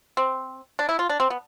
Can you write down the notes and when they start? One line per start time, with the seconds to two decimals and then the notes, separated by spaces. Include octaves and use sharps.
0.17 C4
0.79 D4
0.89 E4
0.99 F4
1.09 D4
1.20 C4
1.30 B3